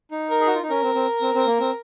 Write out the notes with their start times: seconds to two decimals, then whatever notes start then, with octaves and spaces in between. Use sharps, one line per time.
0.11 D#4
0.30 A#4
0.40 G#4
0.47 F#4
0.55 F4
0.62 D#4
0.70 C#4 A#4
0.83 C4
0.95 C4
1.22 C4
1.34 C4
1.47 A#3
1.59 C4